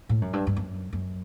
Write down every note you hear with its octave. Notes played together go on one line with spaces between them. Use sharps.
A2
F#2
G2
G2
F#2
F#2